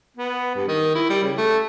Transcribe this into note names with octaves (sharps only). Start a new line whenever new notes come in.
B3
G2
D#3
E4
G3
C#3
A3